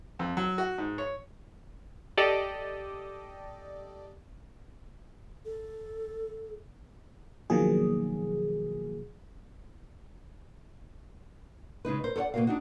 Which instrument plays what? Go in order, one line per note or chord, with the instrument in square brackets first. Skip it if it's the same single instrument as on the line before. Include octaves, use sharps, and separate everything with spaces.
[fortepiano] F2
F#3
F#4
G#2
C#5
[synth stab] G4 A4 D5 D#5
[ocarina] A4
[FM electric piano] B2 D#3 F3 F#3 A#3 G#4
[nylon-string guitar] C#3 G#3 D#4 B4
A#4 C5
A4 A#4 C#5 D5 F#5
B2 A#3 D4 F#4 A#4 F5
D4 D#4 F#4